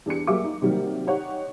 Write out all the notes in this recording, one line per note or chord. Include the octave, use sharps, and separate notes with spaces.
E2 D4 G4 C#7
F#3 G3 A#3 G#4 E5 D6
D#4
C3 D#3 F#3 G3 A#3
D#4 G4 C#5 F#5